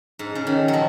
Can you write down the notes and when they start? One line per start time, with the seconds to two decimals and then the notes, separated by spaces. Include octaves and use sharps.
0.19 G#2
0.35 C#3
0.47 D#3
0.68 F#3
0.73 F3